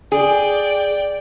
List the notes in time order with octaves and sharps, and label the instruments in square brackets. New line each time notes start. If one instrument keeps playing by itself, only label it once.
[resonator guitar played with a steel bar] G#4 [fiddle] D5 G5